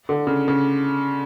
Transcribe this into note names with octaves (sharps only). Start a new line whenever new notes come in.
D3
C#3
C#3